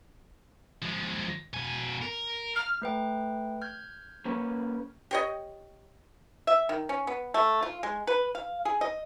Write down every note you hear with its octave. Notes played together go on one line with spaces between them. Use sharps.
F3 G#3
B2 G#5
A#4
F6
A3 B4 G5
F6 G6 G#6
A#3 C#4 B4
G4 C#5 D#5
E5
D#3
C#4
B3
A3
F4
G#3
B4
F5
G#4
D#5